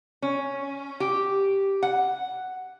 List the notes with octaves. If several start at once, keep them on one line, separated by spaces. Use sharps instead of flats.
C#4
G4
F#5